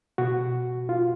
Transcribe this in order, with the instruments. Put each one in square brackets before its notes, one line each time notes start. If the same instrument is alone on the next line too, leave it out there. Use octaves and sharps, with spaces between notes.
[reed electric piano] B2 F#4
F4